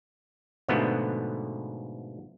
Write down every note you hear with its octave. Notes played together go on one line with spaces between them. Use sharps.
G#2 B2 D3 F3 A3 B3